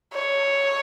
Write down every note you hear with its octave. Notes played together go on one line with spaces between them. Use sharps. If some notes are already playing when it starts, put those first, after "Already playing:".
C#5